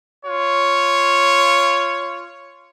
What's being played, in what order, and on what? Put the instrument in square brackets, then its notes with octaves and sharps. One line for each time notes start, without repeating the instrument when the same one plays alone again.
[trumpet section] F4 C#5